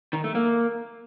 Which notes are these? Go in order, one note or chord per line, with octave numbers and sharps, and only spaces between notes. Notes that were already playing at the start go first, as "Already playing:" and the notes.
D#3
A3
A#3